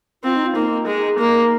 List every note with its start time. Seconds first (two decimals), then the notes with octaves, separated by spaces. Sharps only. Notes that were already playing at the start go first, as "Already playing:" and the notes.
0.24 C4 F4
0.34 D#4
0.45 F4
0.55 A#3 D#4
0.86 G#3
1.18 A#3